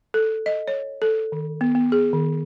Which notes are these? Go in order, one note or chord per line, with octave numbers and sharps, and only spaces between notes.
A4
D#5
C#5
A4
D#3
B3
B3
G#4
D#3